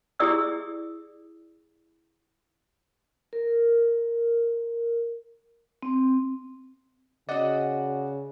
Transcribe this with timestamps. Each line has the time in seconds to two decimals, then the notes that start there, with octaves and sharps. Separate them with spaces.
0.20 E4 G4 G#4 D5 D#6 E6
3.33 A#4
5.83 C4
7.29 C#3 F#4 D5 D#5 F#5